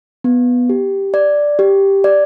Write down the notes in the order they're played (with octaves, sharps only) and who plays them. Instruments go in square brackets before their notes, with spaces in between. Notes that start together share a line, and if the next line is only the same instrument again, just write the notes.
[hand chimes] B3
G4
D5
G4
D5